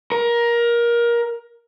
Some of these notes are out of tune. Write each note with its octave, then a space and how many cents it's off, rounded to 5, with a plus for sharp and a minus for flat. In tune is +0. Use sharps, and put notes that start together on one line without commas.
A#4 +20